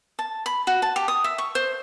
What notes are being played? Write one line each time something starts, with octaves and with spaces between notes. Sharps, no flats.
A5
B5
F#4
A5
G4
D#6
E5
C#6
C5